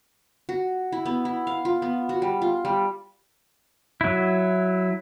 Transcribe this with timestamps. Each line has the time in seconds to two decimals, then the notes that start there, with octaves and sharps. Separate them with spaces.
0.49 F#4
0.92 E4
1.05 B3
1.25 E4
1.47 F5
1.65 F4
1.82 B3
2.09 F#4
2.22 G3
2.42 F4
2.65 G3
4.01 F#3 E4